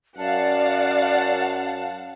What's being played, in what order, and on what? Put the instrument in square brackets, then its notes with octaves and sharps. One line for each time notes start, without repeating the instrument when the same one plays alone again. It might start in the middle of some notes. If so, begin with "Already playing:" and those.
[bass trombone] F#2 [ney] D5 [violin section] F5 F#5 [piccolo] A5